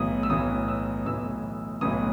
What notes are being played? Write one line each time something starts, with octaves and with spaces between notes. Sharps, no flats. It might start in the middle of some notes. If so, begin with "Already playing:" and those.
Already playing: B1 A2 E3 D#6
E6
B1 A2 E3 D#6
E6
B1 A2 E3 E6
B1 A2 E3 D#6